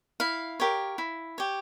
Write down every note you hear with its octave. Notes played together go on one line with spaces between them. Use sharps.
E4 F5
G4 A#4 C#5
E4
G4 C#5